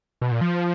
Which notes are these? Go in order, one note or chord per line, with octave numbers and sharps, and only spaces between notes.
B2
A#2
F3